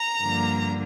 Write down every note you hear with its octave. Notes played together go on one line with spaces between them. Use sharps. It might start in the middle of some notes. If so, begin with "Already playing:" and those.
Already playing: A#5
G2 D3 F3 A#3